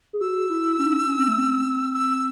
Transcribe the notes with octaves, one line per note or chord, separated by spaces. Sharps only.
G#4
F#4 E6
E4
C#4
D#4
C#4
C#4
C4
A3
C4
E6